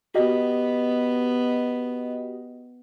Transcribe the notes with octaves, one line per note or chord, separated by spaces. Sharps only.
B3 F#4 G4 D#5